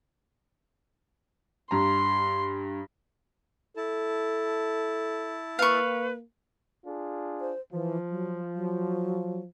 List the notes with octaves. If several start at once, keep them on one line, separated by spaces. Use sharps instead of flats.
G2 A#5 C6
E4 A4 A5
A#3 B4 F5 C#6
D4 F4 G#4
C5
E3 F3
F#3
F#3